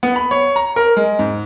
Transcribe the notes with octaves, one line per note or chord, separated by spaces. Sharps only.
B3
B5
C#5
A#5
A#4
G#3
G#2